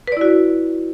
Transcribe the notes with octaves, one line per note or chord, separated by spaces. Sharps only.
E4 F#4 B4 D5